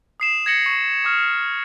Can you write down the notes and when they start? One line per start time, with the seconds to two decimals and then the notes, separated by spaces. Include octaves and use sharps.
0.20 D#6 C7 E7
0.46 G#6 A#6 C#7 F#7
0.66 C#6
1.04 C#6 D#6 F6